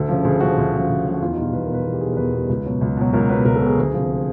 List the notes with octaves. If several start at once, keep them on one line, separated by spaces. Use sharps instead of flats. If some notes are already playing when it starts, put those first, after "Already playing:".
Already playing: D2 A4
C#3 F3
D2 G#4
C#3 F3 F#4
D2
C#3 F3
D2
C#3 F3
F#4
E2 F4
D#4
B2 G3
F4
E2 B4
A#4
B2 G3 B4
E2 A#4
G4
B2 G3 G#4
A#4
E2 B4
B2 G3
C#2
B2 F#3
C#2
B2 F#3
C#2 A#4
B2 F#3 B4
C#2 A#4
A4
B2 F#3 G#4
D2
C3 F3